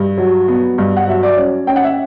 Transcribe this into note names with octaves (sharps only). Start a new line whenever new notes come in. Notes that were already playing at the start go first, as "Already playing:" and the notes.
Already playing: G2
F#3
B3
G2
F#5
F#3 E5
D5
C#4
C#4 G5
F#5
E5